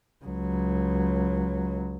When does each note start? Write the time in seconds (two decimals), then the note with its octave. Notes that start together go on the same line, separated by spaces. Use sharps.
0.24 C#2 F#3